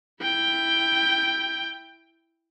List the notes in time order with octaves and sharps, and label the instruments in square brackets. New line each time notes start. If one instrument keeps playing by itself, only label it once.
[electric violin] E4 G5